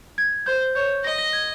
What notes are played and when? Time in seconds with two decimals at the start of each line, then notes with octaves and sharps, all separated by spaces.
0.18 G#6
0.46 C5 G6
0.75 C#5 G6
1.04 D#5 A#6
1.18 A#6
1.33 G#6